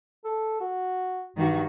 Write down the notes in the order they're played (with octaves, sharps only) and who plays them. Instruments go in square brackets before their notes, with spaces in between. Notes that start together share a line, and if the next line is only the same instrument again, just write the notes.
[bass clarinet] A4
F#4
[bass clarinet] G2 [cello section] D#3 G3 F#4